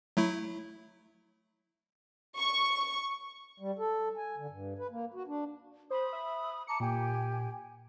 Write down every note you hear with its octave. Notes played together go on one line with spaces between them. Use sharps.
F#3 A3 E4
C#6
G3
A4
G#5
D3
G2
B4
A#3
F#4
D4
C5 B5 D#6
E5
A5 A#5 D6 C#7
A#2 G4 G5 G#5